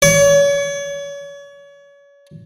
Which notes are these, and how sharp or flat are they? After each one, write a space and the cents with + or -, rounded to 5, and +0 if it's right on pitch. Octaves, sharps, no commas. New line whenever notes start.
C#5 +35